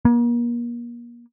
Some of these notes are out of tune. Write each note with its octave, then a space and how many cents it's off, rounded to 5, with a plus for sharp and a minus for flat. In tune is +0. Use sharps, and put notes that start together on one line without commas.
A#3 +35